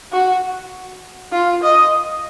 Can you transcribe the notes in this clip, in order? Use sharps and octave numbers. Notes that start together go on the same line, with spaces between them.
F#4
F4
D#5